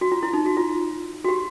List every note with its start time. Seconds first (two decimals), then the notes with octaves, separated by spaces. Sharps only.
0.01 F#4
0.12 F4
0.23 E4
0.33 D#4
0.46 F#4
0.57 F4
1.24 F#4
1.29 G4